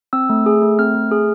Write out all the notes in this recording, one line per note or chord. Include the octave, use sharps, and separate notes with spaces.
C4 E6
A3
G#4
A3
C4 F6
A3
G#4